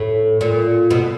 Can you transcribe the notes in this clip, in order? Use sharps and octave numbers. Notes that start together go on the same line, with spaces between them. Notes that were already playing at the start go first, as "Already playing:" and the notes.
Already playing: A2
A#2
B2